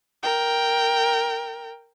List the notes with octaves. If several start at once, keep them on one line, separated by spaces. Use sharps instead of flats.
A#4 G5